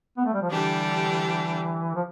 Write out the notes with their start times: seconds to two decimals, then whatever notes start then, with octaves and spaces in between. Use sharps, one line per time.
0.17 B3
0.25 A3
0.33 G3
0.42 F3
0.50 D3 E3 G3 D4 G4
1.95 F3